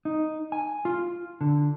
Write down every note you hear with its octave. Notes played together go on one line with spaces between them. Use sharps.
D#4
G#5
F4
D3